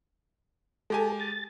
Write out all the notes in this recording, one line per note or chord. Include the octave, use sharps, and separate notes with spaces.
G#3 G4 A4 G#5
A6